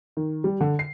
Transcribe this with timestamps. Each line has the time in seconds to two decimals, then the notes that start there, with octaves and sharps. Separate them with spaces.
0.17 D#3
0.44 G3
0.61 D3
0.79 C7